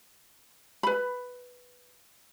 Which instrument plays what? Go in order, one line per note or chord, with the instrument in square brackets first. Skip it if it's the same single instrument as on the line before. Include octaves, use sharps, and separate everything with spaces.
[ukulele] B4 B5